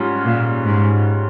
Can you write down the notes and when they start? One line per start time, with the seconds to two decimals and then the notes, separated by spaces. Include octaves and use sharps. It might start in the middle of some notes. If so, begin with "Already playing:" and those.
Already playing: G#2 G3 C#4 F4
0.25 A#2
0.66 G#2